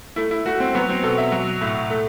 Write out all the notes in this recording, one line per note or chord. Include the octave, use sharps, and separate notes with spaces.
A3 E4
E4
A3 F#4
C4
F#3 B3
C4
B2 A4
E5
F#3
A2
A3